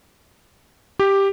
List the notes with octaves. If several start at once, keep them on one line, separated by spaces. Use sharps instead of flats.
G4